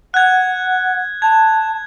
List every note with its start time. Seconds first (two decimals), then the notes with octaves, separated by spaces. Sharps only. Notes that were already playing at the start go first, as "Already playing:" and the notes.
0.14 F#5 F#6 G#6
1.22 A5 G#6